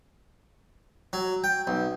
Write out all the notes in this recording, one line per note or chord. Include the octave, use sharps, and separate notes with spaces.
F#3
G5
B1